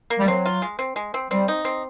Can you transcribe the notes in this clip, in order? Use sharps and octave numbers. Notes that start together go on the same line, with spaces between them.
A#3
G3
F#3 C4
F4
G#3
C4
G#3
C4
G3 C4
D#4
C4